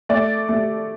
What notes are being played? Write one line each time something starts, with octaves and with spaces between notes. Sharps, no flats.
A3 D5
A3